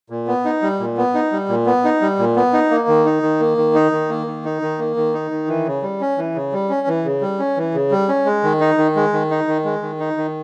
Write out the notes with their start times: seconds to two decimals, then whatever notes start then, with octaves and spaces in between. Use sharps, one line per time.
0.10 A#2
0.27 B3
0.45 D#4
0.62 G3
0.80 A#2
0.97 B3
1.14 D#4
1.32 G3
1.49 A#2
1.66 B3
1.84 D#4
2.02 G3
2.19 A#2
2.36 B3
2.53 D#4
2.71 A#3
2.88 D#3
3.06 D#4
3.23 D#3
3.40 A#3
3.58 D#3
3.75 D#4
3.92 D#3
4.09 A#3
4.27 D#3
4.45 D#4
4.62 D#3
4.79 A#3
4.96 D#3
5.13 D#4
5.31 D#3
5.48 E3
5.66 C#3
5.82 G3
6.01 C#4
6.18 E3
6.35 C#3
6.52 G3
6.70 C#4
6.87 E3
7.04 C#3
7.21 G3
7.39 C#4
7.57 E3
7.74 C#3
7.91 G3
8.09 C#4
8.26 G#3
8.43 D#3
8.60 D#4
8.78 D#3
8.96 G#3
9.13 D#3
9.30 D#4
9.47 D#3
9.64 G#3
9.82 D#3
10.00 D#4
10.17 D#3